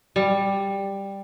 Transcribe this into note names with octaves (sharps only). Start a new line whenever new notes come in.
G3